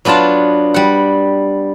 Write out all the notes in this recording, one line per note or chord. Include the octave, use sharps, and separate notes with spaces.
F#3 B3 D4 F4 A5
G3 F#5